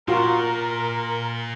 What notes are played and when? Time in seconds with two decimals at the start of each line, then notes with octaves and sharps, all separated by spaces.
0.08 A#2 F4 F#4 A#4